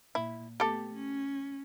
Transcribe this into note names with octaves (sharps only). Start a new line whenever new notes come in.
A#2 E4
A3 B3 G4 A4
C#4